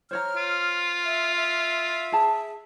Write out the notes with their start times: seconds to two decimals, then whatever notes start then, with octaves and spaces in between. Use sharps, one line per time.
0.11 C5 C#5 A#5 F6
0.36 F4
1.05 E5
1.36 E5
2.12 G#4 A5